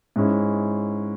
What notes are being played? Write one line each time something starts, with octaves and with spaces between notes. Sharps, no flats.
G#2 G#3 C#4 E4